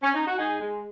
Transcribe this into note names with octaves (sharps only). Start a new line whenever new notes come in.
C#4
D#4
F#4
G#2 D#4 G#4
G#3